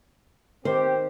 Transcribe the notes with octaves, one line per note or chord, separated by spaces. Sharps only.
D#3 C4 G4 C5